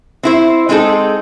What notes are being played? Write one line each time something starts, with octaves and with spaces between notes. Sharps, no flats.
C4 E4 C5
G#3 C4 D#4 G#4 A4